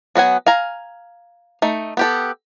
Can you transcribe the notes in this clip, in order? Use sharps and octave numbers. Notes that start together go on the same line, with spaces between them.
F#3 B3 F#5 G#5
F5 G#5 A#5
A3 D#4
B3 G4 A4